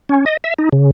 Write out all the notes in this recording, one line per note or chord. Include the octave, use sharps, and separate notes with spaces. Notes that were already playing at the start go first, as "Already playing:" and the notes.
C#4
D#5
E5
D#4
C#3